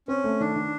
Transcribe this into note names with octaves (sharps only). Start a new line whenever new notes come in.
C4 C#4
A3
D#3 D4
D#3